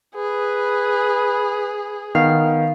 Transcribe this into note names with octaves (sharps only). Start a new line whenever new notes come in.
G#4 B4
D#3 B3 F5